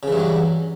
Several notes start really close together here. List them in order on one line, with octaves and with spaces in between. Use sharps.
C#3 E3 G2 F#3